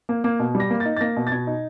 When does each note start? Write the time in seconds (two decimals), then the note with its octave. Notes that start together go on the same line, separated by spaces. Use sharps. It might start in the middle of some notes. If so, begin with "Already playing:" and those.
0.09 A#3
0.24 A#3
0.40 B2
0.55 G3
0.60 A#6
0.70 A#3
0.80 A6
0.85 D#4
0.97 A6
1.01 A#3 A#6
1.17 B2
1.27 A6
1.32 B2 G#6
1.47 D#4